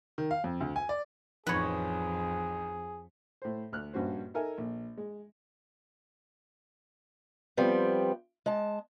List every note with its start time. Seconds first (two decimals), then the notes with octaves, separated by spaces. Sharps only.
0.18 D#3
0.31 F5
0.44 F2
0.61 D2
0.76 G#5
0.89 D5
1.47 A1 F2 D#4 G#4 B4 C#5 B5
3.42 A2 C5
3.72 D2 F6 F#6
3.93 A#1 G2 C#4 F#4 C5
4.34 D#4 A4 A#4 E5 G#5
4.58 A#1
4.97 G#3
7.57 F3 G3 B3 C4
8.46 G#3 A5